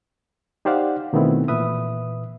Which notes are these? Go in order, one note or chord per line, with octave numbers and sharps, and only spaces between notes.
D#4 G4 C5 D5 F5 F#5
B2 D#3 A3 B3 C4 E4
A#2 E3 B4 E5 D#6